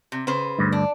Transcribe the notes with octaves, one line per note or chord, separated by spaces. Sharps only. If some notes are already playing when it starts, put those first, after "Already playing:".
C3
C#3 B4 C5
D2 G2
D4